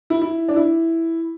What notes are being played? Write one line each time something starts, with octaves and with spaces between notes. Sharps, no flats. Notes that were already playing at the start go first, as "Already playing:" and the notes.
E4
E4
D4
E4